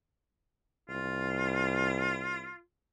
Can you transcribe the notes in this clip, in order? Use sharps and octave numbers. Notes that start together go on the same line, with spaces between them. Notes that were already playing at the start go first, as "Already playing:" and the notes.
C2 F4